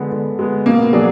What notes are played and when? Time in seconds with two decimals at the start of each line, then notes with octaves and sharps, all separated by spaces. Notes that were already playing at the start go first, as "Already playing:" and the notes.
Already playing: D3 G#3 B3
0.12 D3
0.39 G#3 B3
0.66 B2 A#3
0.93 F#3 D4 G#4